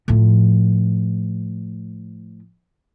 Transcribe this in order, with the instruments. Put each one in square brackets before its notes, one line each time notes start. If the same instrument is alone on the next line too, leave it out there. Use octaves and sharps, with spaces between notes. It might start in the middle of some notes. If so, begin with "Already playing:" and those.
[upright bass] A2 F3